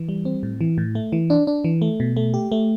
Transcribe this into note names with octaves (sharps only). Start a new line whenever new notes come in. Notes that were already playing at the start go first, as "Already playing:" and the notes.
Already playing: E3
G3
C4
A2
E3
A2
A3
E3
D4
D4
E3
A3
B2
A3
G4
A3